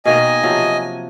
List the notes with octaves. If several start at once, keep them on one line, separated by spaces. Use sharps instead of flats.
B2 D#3 A#3 D#5 G#5
C3 F3 F#3